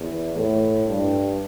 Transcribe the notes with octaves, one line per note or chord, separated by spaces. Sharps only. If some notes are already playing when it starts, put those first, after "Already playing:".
Already playing: E2
A2
G2